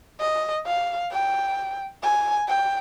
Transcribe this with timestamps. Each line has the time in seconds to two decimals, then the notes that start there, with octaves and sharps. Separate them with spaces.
0.20 D#5
0.66 F5
1.12 G5
2.03 G#5
2.48 G5